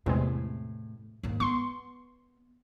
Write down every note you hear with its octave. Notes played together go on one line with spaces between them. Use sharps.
E2 A2 C3 G#3
D#2 G#2
B3 C6 C#6